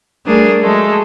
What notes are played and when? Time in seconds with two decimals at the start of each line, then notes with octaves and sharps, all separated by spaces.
0.25 G3 A3 D4 G#4 A#4
0.60 F#3 G#3 A3